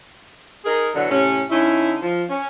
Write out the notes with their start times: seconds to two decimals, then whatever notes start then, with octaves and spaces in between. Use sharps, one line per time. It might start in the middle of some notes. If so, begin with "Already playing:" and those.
0.65 D#4 G#4 A#4
0.95 B2 D3 E3 F#3
1.10 A2 C3 C#4
1.51 D3 C#4 D#4 E4
2.02 F3
2.29 C#4